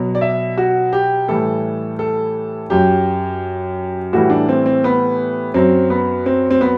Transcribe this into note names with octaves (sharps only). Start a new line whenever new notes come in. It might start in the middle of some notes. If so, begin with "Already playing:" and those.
Already playing: B2 F#3
D5
E5
F#4
G4
A2 E3 G3 A4
A4
F#2 F#3 G4
A2 E3 G3 F#4
D4
C4
C4
B3
F#2 F#3 C4
B3
C4
C4
B3